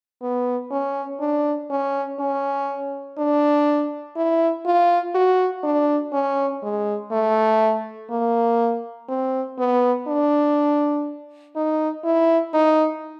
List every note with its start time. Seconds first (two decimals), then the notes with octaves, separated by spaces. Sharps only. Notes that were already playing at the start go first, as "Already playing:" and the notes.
0.22 B3
0.71 C#4
1.20 D4
1.70 C#4
2.19 C#4
3.18 D4
4.16 E4
4.66 F4
5.15 F#4
5.64 D4
6.13 C#4
6.63 G#3
7.11 A3
8.11 A#3
9.09 C4
9.58 B3
10.08 D4
11.56 D#4
12.04 E4
12.54 D#4